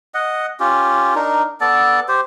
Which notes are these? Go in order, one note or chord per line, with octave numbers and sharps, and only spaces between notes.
D#5 F#5
C#4 F4 G4
D4 D#4 A#4
B3 A4 D5 A5
G4 C5